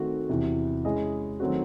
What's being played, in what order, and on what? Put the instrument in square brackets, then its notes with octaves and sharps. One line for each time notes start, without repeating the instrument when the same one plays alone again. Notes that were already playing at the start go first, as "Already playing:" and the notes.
Already playing: [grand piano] D#3 A3 C4 F#4
E2 C3 E3
G#3 C#4 E4 G#4 D#5
D#3 F#3 A3 C4 F#4